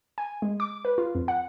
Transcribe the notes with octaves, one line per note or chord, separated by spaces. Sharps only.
G#5
G#3
D6
B4
F4
F2
F#5